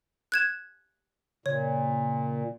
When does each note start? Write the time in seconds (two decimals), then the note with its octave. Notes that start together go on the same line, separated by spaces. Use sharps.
0.32 F#6 G#6 E7
1.46 A#2 C#3 C#5